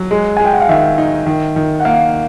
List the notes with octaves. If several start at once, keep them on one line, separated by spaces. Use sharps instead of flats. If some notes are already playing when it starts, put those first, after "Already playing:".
Already playing: F#3
G#3
G#3 G#5
G5
F#5
F5
D#3 E5
D#4
D#3
D#3
F#5
A#3 F5